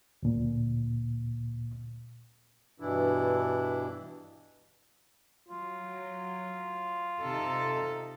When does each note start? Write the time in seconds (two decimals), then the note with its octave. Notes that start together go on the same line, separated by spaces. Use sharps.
0.23 D2 A#2
2.80 G2 B2 E3 D4 E4
5.49 F#3 F4
7.21 C3 D#4 A4